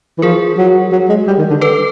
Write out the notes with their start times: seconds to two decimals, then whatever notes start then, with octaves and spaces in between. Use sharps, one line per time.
0.18 E3
0.22 F3 G#4 A#4
0.58 F#3
0.92 F#3
1.09 G#3
1.27 G3
1.38 D#3
1.50 D3
1.61 A4 B4